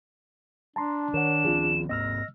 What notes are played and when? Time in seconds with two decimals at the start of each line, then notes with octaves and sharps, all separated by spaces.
0.76 D4 A5 A#5 C6
1.14 D#3 A#4 C#5 F#5 E7
1.45 D#3 F3 C4 F4 G#4
1.89 G#2 A#3 C4 D#5 E6 F6 A#6